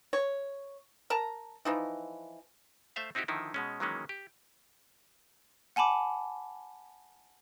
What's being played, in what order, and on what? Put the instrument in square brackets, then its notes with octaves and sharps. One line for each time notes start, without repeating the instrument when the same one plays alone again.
[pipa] C#5
A#4 A5 A#5
E3 F3 D#4
[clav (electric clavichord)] A3 C5 E5 F5
C4 D#4 E4 F#4 G4
D3 D#3 F3 D#4 E4
B2 G#3 C#4
D#3 E3 F#3 G#3 A#3 C#4
G4
[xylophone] F#5 G#5 A5 B5 D6